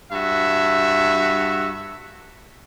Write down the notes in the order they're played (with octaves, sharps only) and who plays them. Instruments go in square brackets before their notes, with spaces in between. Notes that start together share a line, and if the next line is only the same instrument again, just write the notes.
[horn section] G2 F#4 E5